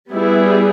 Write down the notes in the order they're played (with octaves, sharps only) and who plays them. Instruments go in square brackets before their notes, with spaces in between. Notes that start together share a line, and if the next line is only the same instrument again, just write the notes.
[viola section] G3 B3 E4 G#4